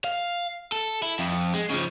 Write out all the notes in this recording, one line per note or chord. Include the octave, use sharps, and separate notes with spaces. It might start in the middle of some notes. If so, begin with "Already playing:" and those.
F5
A4
E4
F2
G#3
C#3 F3